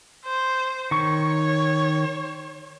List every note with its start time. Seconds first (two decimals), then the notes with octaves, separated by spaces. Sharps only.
0.25 C5
0.91 D#3 C#5 C#6